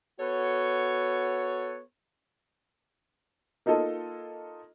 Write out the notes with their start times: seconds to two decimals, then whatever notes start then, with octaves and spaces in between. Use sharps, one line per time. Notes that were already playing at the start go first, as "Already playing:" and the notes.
0.20 B3 F#4 A4 C#5
3.66 A#3 D#4 F4 A4 D#5